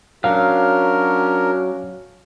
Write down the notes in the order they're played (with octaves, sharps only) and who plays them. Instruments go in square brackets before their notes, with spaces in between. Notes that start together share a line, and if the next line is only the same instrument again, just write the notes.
[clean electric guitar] F#3 [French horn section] C#4 F#4 [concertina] D4 A#4 [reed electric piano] F5